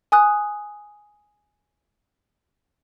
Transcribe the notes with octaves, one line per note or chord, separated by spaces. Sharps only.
G#5 D#6 F#6